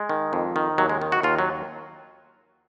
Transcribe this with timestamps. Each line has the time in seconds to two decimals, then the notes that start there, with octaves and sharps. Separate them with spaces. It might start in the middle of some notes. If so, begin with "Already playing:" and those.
Already playing: G#3
0.09 D#3
0.33 F2
0.56 D#3
0.78 D#2 F#3
0.89 G#3
1.01 D#3
1.12 F#4
1.23 D#2 F4
1.39 F#3